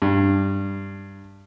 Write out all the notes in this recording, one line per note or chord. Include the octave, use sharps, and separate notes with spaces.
G2